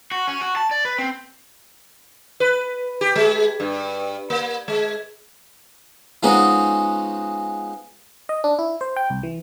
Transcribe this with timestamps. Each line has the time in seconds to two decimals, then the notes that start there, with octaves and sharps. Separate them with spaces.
0.12 F#4
0.28 C#4
0.41 F#4
0.56 A5
0.71 D5
0.85 B4
0.99 C4
2.40 B4
3.01 G4
3.16 G#3
3.60 G2
4.30 A#3
4.68 G#3
6.23 F3 G#3 B3 C#4 D#4 F#4
8.29 D#5
8.44 D4
8.59 E4
8.81 C5
8.96 G5
9.10 C2
9.23 E3